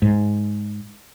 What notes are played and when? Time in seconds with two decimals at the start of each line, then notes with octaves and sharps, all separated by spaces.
0.02 G#2